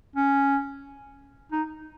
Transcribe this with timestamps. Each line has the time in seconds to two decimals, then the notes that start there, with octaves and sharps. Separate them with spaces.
0.16 C#4
1.52 D#4